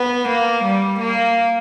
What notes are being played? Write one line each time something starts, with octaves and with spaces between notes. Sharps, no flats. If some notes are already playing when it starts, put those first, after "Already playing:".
Already playing: B3
A#3
G3
A#3